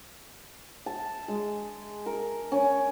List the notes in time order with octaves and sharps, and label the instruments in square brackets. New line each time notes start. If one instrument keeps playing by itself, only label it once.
[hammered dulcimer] A5
G#3
A#4
C#4